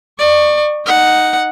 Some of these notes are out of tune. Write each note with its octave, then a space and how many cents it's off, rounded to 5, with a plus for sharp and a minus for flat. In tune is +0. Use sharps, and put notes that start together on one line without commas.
D5 +30 C#6 +0
D#4 +0 F#5 +0